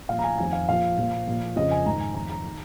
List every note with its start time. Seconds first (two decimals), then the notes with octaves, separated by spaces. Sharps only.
0.09 A#2 F3 F5
0.19 A#5
0.24 G#5
0.38 F2 D#3 G#5
0.53 F5
0.68 A#2 F3 F5
0.98 A#2 F3
1.27 A#2 F3
1.56 F2 C#3 F3 D#5
1.71 G#5
1.86 G#2 D#3 A#5
2.00 G#5
2.15 F2 D#3 A#5
2.29 A#5
2.46 D#3